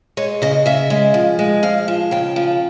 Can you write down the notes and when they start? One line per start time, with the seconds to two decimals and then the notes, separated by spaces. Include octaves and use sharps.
0.17 G#3 C#5
0.42 C#3 D#5
0.66 C#3 E5
0.90 G#3
1.14 F3
1.39 G#3
1.63 F3 F5
1.88 F3
2.11 C#3 G5
2.36 F3